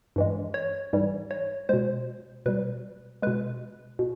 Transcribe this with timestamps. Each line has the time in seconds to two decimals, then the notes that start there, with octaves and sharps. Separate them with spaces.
0.16 G2 E3 G#3
0.54 C#5
0.93 G#2 E3 G3
1.31 C#5
1.69 B2 G#3 C5
2.46 B2 G3 B4
3.22 B2 G#3 B4
3.99 B2